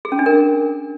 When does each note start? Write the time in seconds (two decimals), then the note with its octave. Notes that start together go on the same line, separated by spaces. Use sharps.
0.05 G#4
0.12 C#4
0.19 D4
0.26 A#4